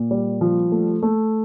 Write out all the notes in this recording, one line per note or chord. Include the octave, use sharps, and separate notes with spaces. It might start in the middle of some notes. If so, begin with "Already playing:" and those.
Already playing: A#2
G3
F3
A3
A3